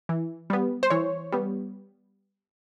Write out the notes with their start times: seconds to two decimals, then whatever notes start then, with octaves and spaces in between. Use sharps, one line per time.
0.09 E3
0.50 G3 B3
0.83 C5
0.90 E3 C#5
1.32 G3 B3